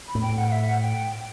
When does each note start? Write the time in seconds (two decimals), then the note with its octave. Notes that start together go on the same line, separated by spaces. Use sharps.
0.08 B5
0.15 A2
0.22 G5
0.37 F#5
0.48 F#5
0.52 E5
0.67 F#5
0.81 G5